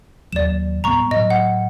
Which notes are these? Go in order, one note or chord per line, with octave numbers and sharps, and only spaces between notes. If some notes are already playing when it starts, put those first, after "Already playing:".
D#2 F#3 D5 E7
A2 G3 B3 A#5 C#6
A2 F#3 D#5
F#5